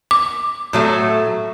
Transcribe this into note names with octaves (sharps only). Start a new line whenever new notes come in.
D6
A2 F#3 A3